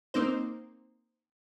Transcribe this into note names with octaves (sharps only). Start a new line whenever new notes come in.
A#3 C4 D#4 C5